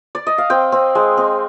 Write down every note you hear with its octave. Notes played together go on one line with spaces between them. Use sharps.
D5
D#5
F5
C4 G5
C4
G#3
C4